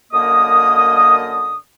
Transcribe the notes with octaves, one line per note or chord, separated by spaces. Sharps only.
F#2 D3 A#3 A#4 D#5 D#6